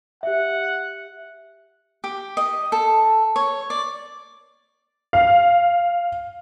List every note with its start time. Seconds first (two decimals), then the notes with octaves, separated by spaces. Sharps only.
0.23 G4 E5 F#5
2.04 G4
2.37 D#5
2.72 A4
3.36 C#5
3.70 D5
5.13 F5